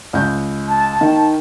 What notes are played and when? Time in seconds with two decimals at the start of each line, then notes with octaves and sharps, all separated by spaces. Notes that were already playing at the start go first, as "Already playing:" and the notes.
0.13 C#2 G6
0.69 A5
1.01 D#3